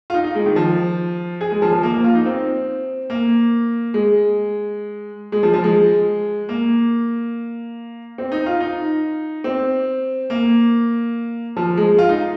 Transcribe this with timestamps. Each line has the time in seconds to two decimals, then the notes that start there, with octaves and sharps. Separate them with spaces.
0.10 F4
0.14 D#4
0.24 D#4
0.35 G#3
0.46 D#3
0.56 F3
1.41 G#4
1.51 G#3
1.62 F3
1.73 F3
1.83 A#3
1.94 A#3
2.04 F4
2.15 D#4
2.25 C4
3.10 A#3
3.94 G#3
5.32 G#3
5.43 F3
5.54 F3
5.64 G#3
6.49 A#3
8.18 C4
8.32 D#4
8.46 F4
8.60 D#4
9.44 C4
10.30 A#3
11.57 F3
11.77 G#3
11.98 F4
12.09 D#4